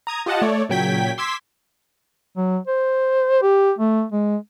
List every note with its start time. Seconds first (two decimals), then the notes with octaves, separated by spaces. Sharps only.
0.07 A#5 D#6 G#6
0.26 F4 G4 D#5 F#5 A5
0.42 A3 C#5 D5
0.69 A#2 C#3 F#3 G5 G#6 B6
1.18 C6 D6 E6 G#6 B6
2.37 F#3
2.68 C5
3.42 G4
3.79 A3
4.12 G#3